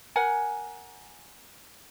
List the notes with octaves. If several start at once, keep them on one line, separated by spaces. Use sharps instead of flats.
A#4 F#5 G#5